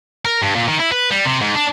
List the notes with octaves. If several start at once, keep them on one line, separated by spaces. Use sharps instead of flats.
A#4
G2
A#2
D#3
E4
B4
G3
C3
G#2
D4